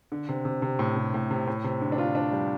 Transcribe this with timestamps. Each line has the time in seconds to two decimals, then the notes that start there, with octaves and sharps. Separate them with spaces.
0.12 D3
0.29 C3
0.45 C3
0.62 C3
0.79 A2
0.96 C3
1.14 A2
1.31 C3
1.47 A2
1.64 C3
1.81 D3
1.92 D4
1.98 F4
2.15 D4
2.32 G3